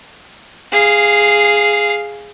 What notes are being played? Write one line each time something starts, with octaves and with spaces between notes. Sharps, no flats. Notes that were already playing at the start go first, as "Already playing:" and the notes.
G#4 F5